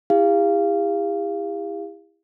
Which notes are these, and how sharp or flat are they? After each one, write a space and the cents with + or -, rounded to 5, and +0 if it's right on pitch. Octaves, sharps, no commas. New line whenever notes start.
E4 +0 G4 +45 F5 -15